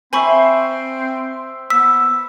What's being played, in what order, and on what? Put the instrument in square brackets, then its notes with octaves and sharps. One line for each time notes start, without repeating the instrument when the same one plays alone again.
[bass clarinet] C4 [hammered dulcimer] C5 E5 [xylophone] G#5 B5 C#6
[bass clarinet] B3 [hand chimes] E6 [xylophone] B6